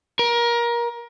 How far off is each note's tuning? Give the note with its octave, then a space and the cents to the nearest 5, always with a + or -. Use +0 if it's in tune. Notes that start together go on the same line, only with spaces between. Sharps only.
A#4 +25